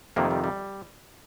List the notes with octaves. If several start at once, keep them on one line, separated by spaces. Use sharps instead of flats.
F2 C3 D#3 A#3
G3
G3